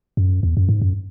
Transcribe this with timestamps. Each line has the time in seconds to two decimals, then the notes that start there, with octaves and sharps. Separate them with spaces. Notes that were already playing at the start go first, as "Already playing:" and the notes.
0.17 F#2
0.43 E2
0.57 F#2
0.69 G#2
0.82 F#2